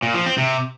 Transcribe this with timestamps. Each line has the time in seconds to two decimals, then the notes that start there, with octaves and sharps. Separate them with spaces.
0.02 A#2
0.14 F3
0.26 C4
0.38 C3